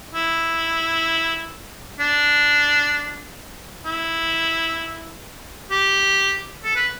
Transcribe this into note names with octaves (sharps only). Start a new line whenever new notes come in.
E4
D4
E4
G4
A4
B4